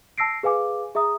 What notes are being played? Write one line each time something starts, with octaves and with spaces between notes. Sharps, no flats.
A5 E6 A#6 C7 D7
G#4 B4 F5 G#5 D6
G#4 E5 A#5 D#6